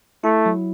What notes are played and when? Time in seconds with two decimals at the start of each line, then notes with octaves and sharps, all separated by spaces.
0.24 A3 E4
0.46 F#3